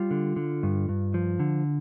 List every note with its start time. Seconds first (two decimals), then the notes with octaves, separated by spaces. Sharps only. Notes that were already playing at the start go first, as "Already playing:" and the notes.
Already playing: G3 F4
0.11 D3
0.36 D3
0.63 G2
0.89 G2
1.14 F3
1.40 D3